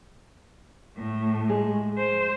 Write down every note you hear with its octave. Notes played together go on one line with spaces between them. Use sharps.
A2 A3
G#3
C5